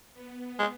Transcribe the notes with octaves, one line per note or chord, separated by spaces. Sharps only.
B3
G#3